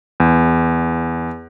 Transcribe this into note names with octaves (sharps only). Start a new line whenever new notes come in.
E2